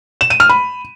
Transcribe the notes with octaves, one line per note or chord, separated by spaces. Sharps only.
E7
D#7
F6
B5